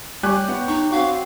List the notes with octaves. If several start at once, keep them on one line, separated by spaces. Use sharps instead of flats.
G3 G4 C#5 G#5 F#6
B3
D#4 C#6
C4 F#4 F5